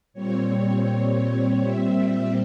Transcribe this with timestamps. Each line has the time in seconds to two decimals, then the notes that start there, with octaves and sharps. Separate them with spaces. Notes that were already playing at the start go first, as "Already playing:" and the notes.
0.13 A#2 G3 C4 C#5
1.61 E5